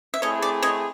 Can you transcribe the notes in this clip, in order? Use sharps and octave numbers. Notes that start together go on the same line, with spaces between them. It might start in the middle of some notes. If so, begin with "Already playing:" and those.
E5
A3 C4 E4 G#4 C#5 D#5
D5
C#5 D#5